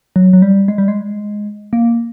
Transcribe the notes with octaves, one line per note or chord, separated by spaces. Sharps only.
F#3
F#3
G3
G#3
G3
G#3
A#3